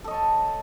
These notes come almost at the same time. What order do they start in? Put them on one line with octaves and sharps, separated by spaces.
A4 D#5 C#5 A5